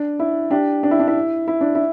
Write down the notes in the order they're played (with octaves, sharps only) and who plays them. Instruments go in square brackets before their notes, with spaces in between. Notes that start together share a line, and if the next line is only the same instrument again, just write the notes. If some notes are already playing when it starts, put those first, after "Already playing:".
Already playing: [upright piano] D4
E4
D4 G4
D4
E4
D4
E4
E4
D4
E4